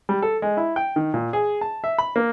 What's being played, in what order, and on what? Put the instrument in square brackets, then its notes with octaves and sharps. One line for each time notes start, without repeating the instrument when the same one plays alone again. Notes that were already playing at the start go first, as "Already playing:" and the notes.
[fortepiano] G3
A4
G#3
E4
G5
D#3
A#2
G#4
A5
E5
B5
A#3